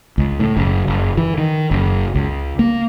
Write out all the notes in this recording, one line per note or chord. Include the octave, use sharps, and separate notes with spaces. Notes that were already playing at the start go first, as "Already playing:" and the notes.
C#2
A2
F#1
F#1
E3
D#3
F#1
C#2
A#3